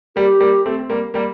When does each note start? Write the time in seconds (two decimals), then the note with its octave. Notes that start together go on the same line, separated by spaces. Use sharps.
0.16 G3 A#3 G4
0.40 G3 A#3
0.66 A3 C4
0.79 C4
0.90 G3 A#3
1.14 G3 A#3